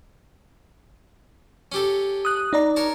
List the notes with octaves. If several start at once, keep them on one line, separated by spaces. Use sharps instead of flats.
C#4 G4 A4
D#6 F#6
D#4 D5 A#5
A#4 C#5 A5